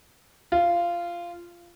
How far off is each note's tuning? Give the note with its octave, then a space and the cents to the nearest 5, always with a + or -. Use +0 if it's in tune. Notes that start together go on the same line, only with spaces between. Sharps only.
F4 -15